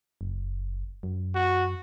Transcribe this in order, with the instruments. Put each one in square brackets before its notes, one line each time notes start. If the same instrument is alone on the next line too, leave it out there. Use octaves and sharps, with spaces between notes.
[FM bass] F#1
F#2
[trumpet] F#4